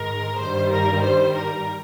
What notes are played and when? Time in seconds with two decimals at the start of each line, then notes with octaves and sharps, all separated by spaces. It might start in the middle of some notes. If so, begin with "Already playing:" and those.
Already playing: G#2 D#3 G#3 A#4
0.39 G2 D#3 G3 C5
0.71 A#4
1.03 C5
1.35 A#4